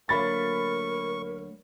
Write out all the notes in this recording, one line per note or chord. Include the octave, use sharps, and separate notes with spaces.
D2 F#3 A#3 A#4 B5 C#6 A6